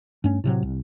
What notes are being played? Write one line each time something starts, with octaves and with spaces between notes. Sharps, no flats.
G2 A3 C#4
A2 C3 F#3
C2